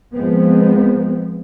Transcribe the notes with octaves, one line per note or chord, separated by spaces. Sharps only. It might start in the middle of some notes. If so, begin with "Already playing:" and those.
F3 G#3 B3 C4